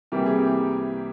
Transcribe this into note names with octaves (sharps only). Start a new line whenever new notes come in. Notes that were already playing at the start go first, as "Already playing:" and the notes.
C2 C3 E3 G3 A#3 G4
G#4
G4